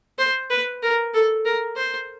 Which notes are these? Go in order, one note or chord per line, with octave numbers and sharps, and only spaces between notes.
C5
B4
A#4
A4
A#4
C5